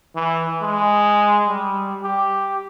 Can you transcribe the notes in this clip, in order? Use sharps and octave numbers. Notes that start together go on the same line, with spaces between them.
E3
G#3
G3
G4